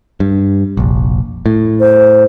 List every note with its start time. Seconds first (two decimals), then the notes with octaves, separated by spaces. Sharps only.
0.20 G2
0.77 F1 A#1
1.46 A2
1.80 C5